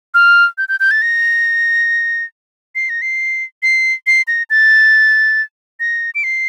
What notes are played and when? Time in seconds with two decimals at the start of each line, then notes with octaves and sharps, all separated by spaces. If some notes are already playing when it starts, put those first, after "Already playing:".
0.14 F6
0.58 G6
0.69 G6
0.80 G6
0.91 A6
1.02 A#6
2.75 C7
2.89 A#6
3.02 C7
3.63 C7
4.07 C7
4.28 A#6
4.50 A6
5.80 A#6
6.15 D7
6.24 C7